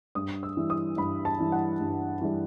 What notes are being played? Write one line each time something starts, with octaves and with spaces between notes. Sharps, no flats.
G2 D#6
E6
E3 G3
D#6
G2 B5
A5
E3 G3
F#5
G2
E3 G3